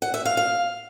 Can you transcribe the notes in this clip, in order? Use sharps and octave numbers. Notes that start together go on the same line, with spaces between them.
F#5
E5
F5
F5